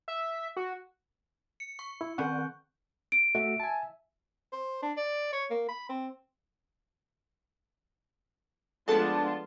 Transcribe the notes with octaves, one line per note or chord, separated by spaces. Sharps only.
E5
F#4
C#7
C#6
E4
D#3 C4 C#4 F#5 C#6 F#6 G6
D7
A3 F#4 E5
G#5 A5
C5
D4
D5
C#5
A#3
B5
C4
F3 G#3 A3 B3 D4 F4 A4 A5